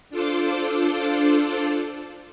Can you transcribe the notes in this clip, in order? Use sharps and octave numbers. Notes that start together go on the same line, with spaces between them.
D4 F4 A4 C5 D5